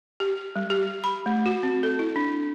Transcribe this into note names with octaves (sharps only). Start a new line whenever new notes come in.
G4
G3
G4
B5
A3
F#4
C4
A4
E4
D4